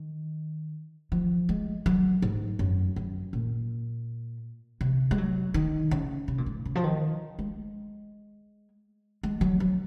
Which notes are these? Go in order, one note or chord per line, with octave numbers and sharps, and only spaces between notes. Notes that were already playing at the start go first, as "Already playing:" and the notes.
Already playing: D#3
F3
G#3
F#3
G#2
F#2
F#2
A#2
C3
G#3
F#3
D#3
C#3
C3
A#2
G#2
C#3
F3
D#3
G#3
G#3
F#3
F#3